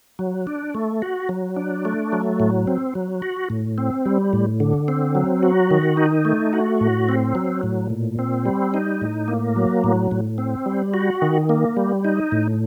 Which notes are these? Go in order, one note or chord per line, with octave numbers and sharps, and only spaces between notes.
F#3
D4
A3
F#4
F#3
D4
A3
F#3
A2
C4
F#3
F#4
A2
C4
G3
A2
D3
C4
F#3
F#4
D#3
D#4
A3
F#4
A2
C4
F#3
A2
A#2
C4
G3
D#4
A2
A#3
F#3
A2
A2
C4
G3
F#4
D#3
A#3
G3
D#4
A2